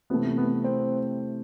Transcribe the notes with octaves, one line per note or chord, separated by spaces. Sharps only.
C3 E3 A3 B3
B3
C4